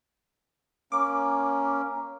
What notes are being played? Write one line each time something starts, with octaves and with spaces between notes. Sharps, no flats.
A#3 C#4 D6